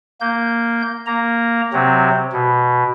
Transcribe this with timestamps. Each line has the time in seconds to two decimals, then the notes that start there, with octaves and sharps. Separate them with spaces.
0.21 A#3 G6
1.06 A#3 A#5
1.73 C3 F#3 C4
2.33 B2